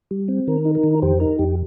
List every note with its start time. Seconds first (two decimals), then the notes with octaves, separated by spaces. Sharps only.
0.11 G3
0.28 C4
0.47 D#3 A#4
0.65 D#4
0.75 A#4
0.84 D#3
1.02 F2 G4 C5
1.20 D#4 A#4
1.39 F2 G4